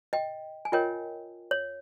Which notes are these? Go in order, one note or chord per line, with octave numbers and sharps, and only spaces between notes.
D#5 G5
G#5
F4 A#4 C#5 D#5 G5
C#5